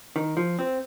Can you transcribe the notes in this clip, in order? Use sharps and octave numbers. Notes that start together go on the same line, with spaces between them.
D#3
F3
C4